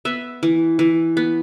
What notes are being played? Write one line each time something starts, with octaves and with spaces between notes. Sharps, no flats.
B3 E5
E3
E3
B3